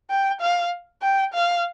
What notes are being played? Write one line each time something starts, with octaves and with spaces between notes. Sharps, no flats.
G5
F5
G5
F5